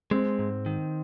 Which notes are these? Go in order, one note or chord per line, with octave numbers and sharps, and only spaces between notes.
G#3 C4
G#2
D#3